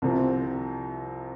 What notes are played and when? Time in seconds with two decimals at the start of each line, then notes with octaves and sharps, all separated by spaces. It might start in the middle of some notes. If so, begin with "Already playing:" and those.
0.02 C2 C3 F3 C4